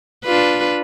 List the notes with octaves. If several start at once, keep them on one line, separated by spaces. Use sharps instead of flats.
D4 F4 B4